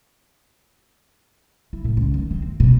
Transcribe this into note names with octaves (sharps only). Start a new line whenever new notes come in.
E4
A2
C#2
D#3
C4
G1
B2